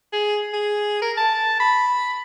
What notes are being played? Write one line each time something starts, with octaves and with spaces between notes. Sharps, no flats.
G#4
G#4
A#4
A5
B5